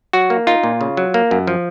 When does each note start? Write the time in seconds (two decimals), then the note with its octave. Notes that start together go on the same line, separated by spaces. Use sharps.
0.13 F#3 F#4
0.30 A#3
0.47 D#4 F4
0.63 A#2
0.81 C#3
0.97 F#3
1.14 A#3
1.31 F#2
1.47 F3